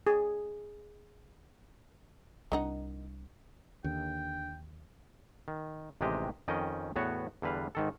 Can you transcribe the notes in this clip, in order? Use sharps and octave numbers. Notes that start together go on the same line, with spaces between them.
G#4
C2 D#3 D4 D#4 F#5
D#2 D3 G5
D#3
A1 C3 D#3 G#3 G4 D#5
F2 D#3 C#4 D#5 G5
E2 A2 B3 F#4 C#5
E2 D3 G3 B4 F5
G#2 D#3 A4